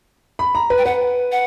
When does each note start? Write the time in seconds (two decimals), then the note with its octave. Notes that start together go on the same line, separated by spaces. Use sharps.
0.39 B5
0.55 A#5
0.70 B4
0.78 G5
0.85 B4 F#5
1.32 F#5